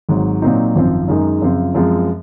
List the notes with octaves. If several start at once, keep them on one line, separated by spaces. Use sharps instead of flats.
G#1 G#2 F#3
A#2 F#3 C4 D#4
G#1 F#2 F3 C4
F#2 D#3 G#3 D#4 G#4
F#2 C#3 F3 C4 F4
F#2 F3 G#3 C4